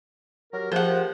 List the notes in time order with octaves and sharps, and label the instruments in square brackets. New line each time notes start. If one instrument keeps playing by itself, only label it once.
[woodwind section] F#3 G4 A#4
[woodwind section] F3 [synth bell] G4 G#4 A#4 [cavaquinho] C5 F#5